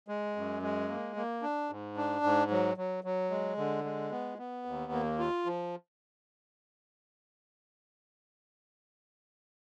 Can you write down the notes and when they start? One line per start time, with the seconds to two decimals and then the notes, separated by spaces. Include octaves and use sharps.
0.08 G#3
0.36 F#2
0.62 G#3
0.88 A#3
1.16 A#3
1.42 D4
1.70 G#2
1.97 D4
2.24 G#2
2.51 F#3
2.77 F#3
3.04 F#3
3.30 G#3
3.57 D3
3.84 G#3
4.11 B3
4.38 B3
4.65 D#2
4.92 A#3
5.19 F4
5.46 F3